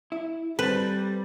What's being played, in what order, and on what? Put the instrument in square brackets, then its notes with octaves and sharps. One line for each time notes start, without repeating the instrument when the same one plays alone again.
[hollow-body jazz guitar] E4
[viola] G3 [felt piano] C4 A6 [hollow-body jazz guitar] A4 [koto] B4